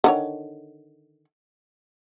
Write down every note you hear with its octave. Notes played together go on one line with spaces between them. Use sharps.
D3 D#3 C#5